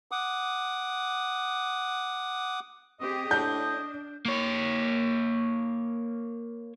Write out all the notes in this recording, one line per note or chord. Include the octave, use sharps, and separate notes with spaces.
F#5 D6 D#6
C4 G4 G#4 D#5
A2 D4 G6
A#3 C#5